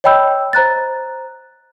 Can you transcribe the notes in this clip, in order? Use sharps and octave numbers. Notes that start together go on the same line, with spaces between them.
C#5 D#5 G5 B5 E6 G6
C5 A#5 F#6 A6